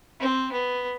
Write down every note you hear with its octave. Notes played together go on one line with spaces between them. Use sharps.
C4
B3